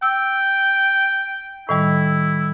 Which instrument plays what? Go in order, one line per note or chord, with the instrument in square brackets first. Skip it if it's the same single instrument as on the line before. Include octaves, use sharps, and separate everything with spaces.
[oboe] G5 [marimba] E6
[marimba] A2 D#3 G3 [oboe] E4